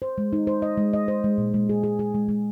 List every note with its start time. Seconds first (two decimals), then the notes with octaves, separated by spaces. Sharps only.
0.02 C5
0.18 G#3
0.33 D#4
0.47 C5
0.62 D#5
0.77 G#3
0.93 D#5
1.08 C5
1.24 G#3
1.38 A#2
1.54 G#3
1.69 G#4
1.83 G#4
1.99 G#4
2.14 G#3
2.29 G#3